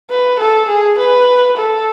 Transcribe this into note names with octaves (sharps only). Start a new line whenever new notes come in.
B4
A4
G#4
B4
A4